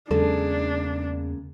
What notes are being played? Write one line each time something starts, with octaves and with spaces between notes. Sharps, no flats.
E2 C#3 F#3 G#3 A#3 D4 A4 A5